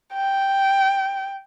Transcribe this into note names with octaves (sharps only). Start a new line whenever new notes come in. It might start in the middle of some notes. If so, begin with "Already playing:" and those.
G5